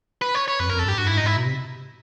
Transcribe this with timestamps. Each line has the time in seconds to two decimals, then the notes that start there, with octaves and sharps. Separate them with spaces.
0.22 B4
0.35 C#5
0.48 C#5
0.59 F2 B4
0.66 F#2
0.69 F2 A#4
0.79 A4
0.85 G2 G4
0.98 G2 F#4
1.07 G#2 E4
1.18 D#4
1.24 G#2 E4
1.37 B2
1.46 C3